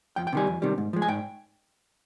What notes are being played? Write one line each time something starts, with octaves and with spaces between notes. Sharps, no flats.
F2 G5
G5
C3 D#3 G3 G#5
F2
C3 D#3 G3
G#2
F3 G#3
G#5
G#2 G5